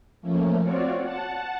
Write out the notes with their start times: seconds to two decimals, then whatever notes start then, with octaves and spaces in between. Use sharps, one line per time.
0.22 F3 A3 A#3 C#4
0.61 C4 F4 F#4 C#5 D5
1.01 F#5 A5